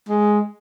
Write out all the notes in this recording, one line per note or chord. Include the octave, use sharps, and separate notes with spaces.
G#3